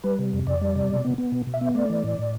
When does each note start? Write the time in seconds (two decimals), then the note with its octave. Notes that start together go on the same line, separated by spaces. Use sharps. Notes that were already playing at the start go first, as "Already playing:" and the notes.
0.04 G3 B4
0.19 C3
0.33 F2
0.47 F2 D5
0.62 G3
0.76 C3
0.90 B2
1.05 B3
1.18 B3
1.32 B2
1.47 B2
1.54 E5
1.61 B3
1.75 A3 D5
1.90 E3
2.04 A2
2.19 A2